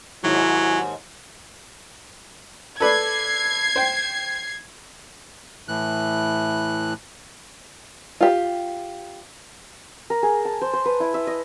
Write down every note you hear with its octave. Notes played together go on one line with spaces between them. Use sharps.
D#2 G#2 F#3 E4
A4 B4 D5 G#6 C7
C5 G5
A2 E3 F#6
F4 G4
A#4
G#4
A5
C5
C5
B4
E4
E5
D#5